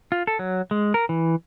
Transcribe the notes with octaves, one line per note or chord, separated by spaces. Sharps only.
F4
A4
F#3
G#3
A#4
E3